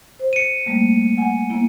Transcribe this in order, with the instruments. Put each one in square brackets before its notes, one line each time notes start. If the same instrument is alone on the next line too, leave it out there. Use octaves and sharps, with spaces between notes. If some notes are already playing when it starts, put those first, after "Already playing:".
[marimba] C5
[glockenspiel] C#7 D#7
[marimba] G3 A3 A#3
F#5 G#5
A#3 B3 E4